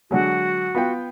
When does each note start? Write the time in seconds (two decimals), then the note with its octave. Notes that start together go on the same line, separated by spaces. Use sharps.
0.11 D3 F#3 G#3 F#4
0.75 B3 F4 G5